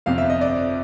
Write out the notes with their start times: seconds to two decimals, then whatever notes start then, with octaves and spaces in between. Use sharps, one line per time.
0.06 G1 F2 C3 F5
0.18 E5
0.30 D#5
0.41 D5